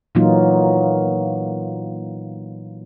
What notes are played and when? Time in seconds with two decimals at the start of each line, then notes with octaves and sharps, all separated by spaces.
0.15 A#2 E3 F#3 A#3 D#4 F4